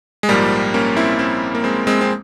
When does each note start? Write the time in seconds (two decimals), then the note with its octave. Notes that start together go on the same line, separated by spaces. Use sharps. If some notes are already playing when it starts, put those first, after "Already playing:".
0.23 G#3
0.29 A#1 G#2 F3 G3 A#3
0.74 A#3 C#4
0.97 C4 E4
1.19 C4 E4
1.55 A#3
1.64 G#3 C4
1.87 G#3 C4
2.01 C4